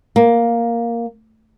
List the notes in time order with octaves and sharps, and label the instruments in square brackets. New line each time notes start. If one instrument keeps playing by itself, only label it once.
[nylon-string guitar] A#3